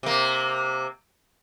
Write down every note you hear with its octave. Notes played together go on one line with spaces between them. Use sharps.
C3 A#3